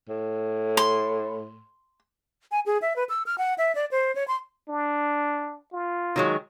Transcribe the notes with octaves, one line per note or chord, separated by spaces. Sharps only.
A2
C6
G#5
G#4
E5
B4
E6
F6
F#5
E5
D5
C5
C#5
C6
D4
F4
D#3 F#3 G#3